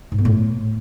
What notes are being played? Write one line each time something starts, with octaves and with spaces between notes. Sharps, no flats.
G#2
B3
A2